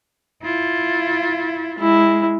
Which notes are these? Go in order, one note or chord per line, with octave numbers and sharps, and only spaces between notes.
E4 F4
G#3 E4